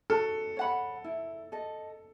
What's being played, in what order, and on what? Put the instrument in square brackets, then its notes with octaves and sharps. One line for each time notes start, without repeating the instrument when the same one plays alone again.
[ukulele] F#4 [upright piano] A4
[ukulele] C#5 F#5 B5
E4
A4 D#5